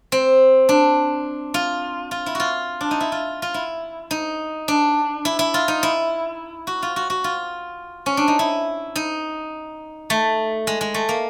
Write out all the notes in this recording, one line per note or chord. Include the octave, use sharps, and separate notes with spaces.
C4
D4
F4
F4
E4
F4 F#4
D4
D#4
E4
F4
F4
E4
D#4
D4
E4
E4
F4
D#4
E4
F#4
F4
F#4
F#4
F4
C#4
D4
D#4
E4
D#4
A3
G#3
G#3
A3
A#3